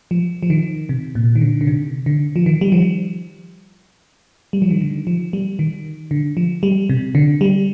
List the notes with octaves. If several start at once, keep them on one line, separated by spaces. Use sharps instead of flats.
F3
F3
D#3
C3
A#2
D#3
D3
D3
C3
D3
F3
D#3
G3
F3
G3
F3
D#3
D3
F3
G3
D#3
D3
F3
G3
C3
D3
G3